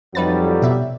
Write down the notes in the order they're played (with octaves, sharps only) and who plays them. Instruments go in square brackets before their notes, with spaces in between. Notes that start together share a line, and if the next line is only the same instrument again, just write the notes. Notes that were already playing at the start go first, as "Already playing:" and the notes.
[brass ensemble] F2 [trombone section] F#3 G3 [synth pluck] D#4 B4 A6
[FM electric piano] B2 [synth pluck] D5 E5